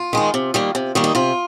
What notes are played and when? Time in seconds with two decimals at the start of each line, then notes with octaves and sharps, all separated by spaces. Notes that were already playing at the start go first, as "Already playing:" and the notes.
Already playing: F4
0.13 D#3 G#3 D#4
0.34 C3
0.54 D#3 G3 A#3
0.75 C3
0.95 D#3 G3 A#3
1.04 D#4
1.15 C3 F4